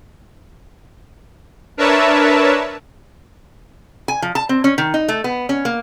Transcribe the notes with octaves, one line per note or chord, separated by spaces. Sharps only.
D4 A#4 B4 C#5 E5 A5
G#5
F3
A5
C4
C#4
D#3
D#4
A3
B3
C#4
A#3